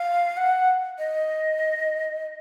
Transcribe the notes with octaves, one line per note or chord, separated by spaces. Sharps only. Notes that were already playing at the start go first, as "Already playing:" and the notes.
Already playing: F5
F#5
D#5